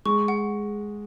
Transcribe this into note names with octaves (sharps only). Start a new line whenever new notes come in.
G#3 C#6
F#5